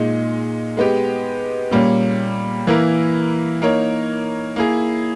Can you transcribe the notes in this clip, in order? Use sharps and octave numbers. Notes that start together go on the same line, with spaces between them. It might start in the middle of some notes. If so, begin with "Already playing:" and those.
Already playing: A#2 G#3 D#4
G#3 B3 G4
A#2 G3 A#3 C#4
E3 A#3 E4 A#4
A#3 D#4 A#4 C#5
A#3 E4 G#4